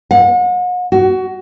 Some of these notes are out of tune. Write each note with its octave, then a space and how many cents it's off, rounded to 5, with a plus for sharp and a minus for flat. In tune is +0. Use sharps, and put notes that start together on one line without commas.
F#5 -40
F#4 +20